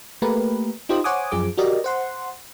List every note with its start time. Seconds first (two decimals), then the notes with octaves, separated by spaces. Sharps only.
0.22 A3 A#3 G4 A#4 B4
0.89 D#4 F4 G4 C5 D#5
1.04 C5 C#5 F#5 G#5 D6 D#6
1.32 F#2 F3 G#4 D6
1.57 F#4 G4 A#4 D5 D#5
1.84 C5 F#5 C6